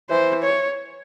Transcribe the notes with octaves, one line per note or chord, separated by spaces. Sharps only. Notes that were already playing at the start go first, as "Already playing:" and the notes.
E3 C5
C#5